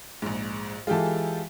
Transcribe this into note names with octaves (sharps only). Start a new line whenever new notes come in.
A#1 G#2
E3 G#3 F4 G4 A4